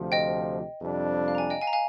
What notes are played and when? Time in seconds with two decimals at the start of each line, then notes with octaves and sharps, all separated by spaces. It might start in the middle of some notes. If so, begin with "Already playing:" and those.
Already playing: D2 C3 F3
0.12 D#5 G5
0.81 F2 C3 G3 D4
1.28 F5
1.35 A#5
1.38 F5 G#5
1.50 D#5 G5
1.61 F5 G#5
1.67 A#5
1.73 F5 G#5